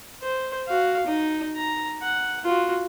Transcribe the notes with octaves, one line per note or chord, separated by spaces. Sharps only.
C5
F#4 F5
D#4
A#5
F#5
F4 F#4